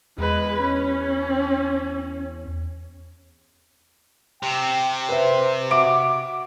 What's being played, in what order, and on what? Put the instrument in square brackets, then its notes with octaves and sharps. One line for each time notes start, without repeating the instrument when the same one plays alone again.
[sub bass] E2 [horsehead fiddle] G#3 B4
[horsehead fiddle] C#4
[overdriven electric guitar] C3 [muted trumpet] G5
[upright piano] B4 E5 [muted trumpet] C5
[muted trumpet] F#4 [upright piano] E5 [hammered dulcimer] D6